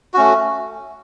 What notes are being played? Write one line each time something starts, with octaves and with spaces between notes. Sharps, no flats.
A3 C#4 F#4